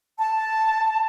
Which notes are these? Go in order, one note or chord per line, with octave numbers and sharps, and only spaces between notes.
A5